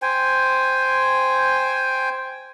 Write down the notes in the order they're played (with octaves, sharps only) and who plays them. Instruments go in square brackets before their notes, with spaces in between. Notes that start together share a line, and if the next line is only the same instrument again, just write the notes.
[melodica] C5 G5 G#5